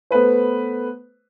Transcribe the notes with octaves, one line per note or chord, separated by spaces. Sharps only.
A3 B3 B4 C5